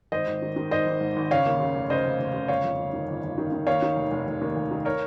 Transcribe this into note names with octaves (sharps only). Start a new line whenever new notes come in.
G#1 C5 D#5
G#1
D#3
D#3
G#1 C5 D#5
G#1
G#2
G#1
C#3 C#5 F5
D#2
C#3
F1
C#3 C5 D#5
F1
F1
C#3
G1 C#5 F5
F2
G1
D#3
G1
G1
D#3
D#3
D#2 C#5 F5
D#3
F1
F1
F1
D#2
F1
D#3
A#4 C#5